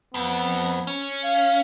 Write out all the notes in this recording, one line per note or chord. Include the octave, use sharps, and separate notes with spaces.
F2 B3
C#4
F5